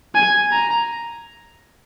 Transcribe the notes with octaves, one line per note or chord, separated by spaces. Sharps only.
G#5
A#5